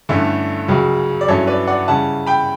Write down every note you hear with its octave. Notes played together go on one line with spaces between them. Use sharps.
G2 D3 A3 C#4 E4
C#2 C#3 F#3
D5
G2 F#3 C#4 E4 A4 C#5
B4 D5
D5 F#5
C#3 G3 C#4 E4 F#5 A5
G5 B5